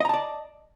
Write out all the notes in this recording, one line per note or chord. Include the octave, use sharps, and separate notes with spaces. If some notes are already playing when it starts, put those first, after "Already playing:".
D5 D#5 A5 A#5